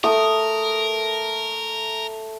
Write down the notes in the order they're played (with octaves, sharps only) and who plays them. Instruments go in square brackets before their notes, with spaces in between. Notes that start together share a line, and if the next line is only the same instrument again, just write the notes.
[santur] A3 D#6 [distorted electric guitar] A#4